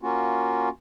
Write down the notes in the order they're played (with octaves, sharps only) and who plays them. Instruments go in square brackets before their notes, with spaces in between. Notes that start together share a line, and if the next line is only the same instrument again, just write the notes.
[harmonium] A#3 C#4 F4 F#4